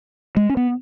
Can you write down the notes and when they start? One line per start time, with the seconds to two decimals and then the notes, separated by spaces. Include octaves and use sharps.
0.37 G#3
0.49 C#4
0.57 B3